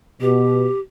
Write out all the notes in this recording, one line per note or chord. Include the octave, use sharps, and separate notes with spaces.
B2 G4